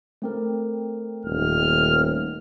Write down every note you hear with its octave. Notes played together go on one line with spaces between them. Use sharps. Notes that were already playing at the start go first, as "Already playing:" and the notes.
A3 C4 A#4
D#1 F6